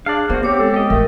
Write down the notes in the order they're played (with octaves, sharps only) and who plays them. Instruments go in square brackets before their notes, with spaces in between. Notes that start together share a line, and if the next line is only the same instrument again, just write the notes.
[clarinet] D4 [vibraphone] G#4 [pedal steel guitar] D5 F5
[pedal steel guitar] A#3 F#4 [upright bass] B3 [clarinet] C5
[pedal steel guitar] C4 [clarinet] G4 [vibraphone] C#5 D6
[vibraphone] G#3 [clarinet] A4
[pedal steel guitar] G4 D#5
[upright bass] A1 [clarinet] A3 [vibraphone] A#4